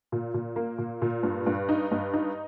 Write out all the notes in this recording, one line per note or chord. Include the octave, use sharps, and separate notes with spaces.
A#2
A#2
A#3
A#2
A#2
G2
G2
D#4
G2
D#4